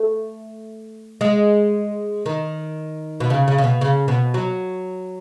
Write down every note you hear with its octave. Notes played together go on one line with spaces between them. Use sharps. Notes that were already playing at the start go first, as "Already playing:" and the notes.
Already playing: A3
G#3
D#3
B2
C#3
C#3
C#3
B2
C#3
B2
F#3